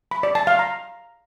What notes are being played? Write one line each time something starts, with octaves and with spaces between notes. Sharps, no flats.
B5
D5
A5
F5
A#5